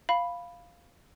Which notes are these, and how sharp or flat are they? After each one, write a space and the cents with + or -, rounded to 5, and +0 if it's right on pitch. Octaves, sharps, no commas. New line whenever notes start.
F5 +0 B5 +0